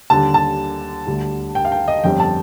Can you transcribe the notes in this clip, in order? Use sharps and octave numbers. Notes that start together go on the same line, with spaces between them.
D#2 D3 G3 A5
A5
D2 D3 G3
G5
F5
G5
D#5
G1 F2 D3 G3 G5
A5